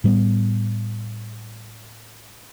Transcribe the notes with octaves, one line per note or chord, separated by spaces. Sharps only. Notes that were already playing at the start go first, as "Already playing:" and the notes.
A2 G3 A3 B3